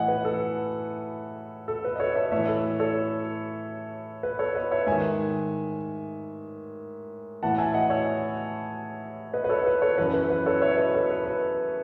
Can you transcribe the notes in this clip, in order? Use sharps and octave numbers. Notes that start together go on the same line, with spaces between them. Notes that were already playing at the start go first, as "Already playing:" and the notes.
Already playing: A2 E3 D#5 E5 F#5 G#5
B4
A4
A4
B4
D#5
A4 C#5
C#5 E5
A2 E3 C#5 E5
A4
A4 C#5
B4
A4 C#5
B4 D#5
C#5 E5
G#2 D#3 E5 G#5
A2 E3 F#5 A5
E5 G#5
D#5 F#5
C#5 E5
B4 D#5
B4
A4 C#5
B4
A4 C#5
F#2 E3 B4
B4
B4
A4 C#5
C#5 E5
B4 D#5
A4 C#5
B4
B4